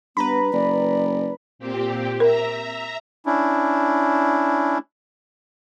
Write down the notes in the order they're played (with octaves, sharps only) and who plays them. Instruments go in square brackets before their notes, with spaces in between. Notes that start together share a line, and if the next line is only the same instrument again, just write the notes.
[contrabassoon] G2 [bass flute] B3 [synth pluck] B4 A#5 B5
[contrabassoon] F#1 [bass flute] D5
[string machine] A#2 C4 G4
[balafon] A#4 [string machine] E5 A#5
[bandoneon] C#4 D4 E4